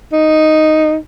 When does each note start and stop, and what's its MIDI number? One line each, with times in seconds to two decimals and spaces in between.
0.13 0.96 63